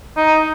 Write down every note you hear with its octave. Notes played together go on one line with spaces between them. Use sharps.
D#4